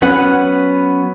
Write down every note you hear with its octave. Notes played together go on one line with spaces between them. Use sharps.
F#3 B3 C#4 B4 F#5